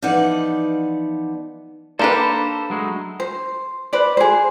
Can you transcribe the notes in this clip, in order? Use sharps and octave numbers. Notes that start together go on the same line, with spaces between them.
E3 F3 B3 D#4 D5 F#5
A#3 D4 G4 A4 B4 C5 A#5 B5
F#3 G#3 A3
C5
B4 C5 D5
G#4 C5